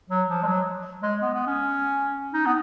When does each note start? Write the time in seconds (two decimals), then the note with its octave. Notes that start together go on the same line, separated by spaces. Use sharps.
0.10 F#3
0.28 F3
0.43 G#3
0.46 F#3
1.02 G#3
1.22 B3
1.34 B3
1.47 C#4
2.33 D#4
2.46 B3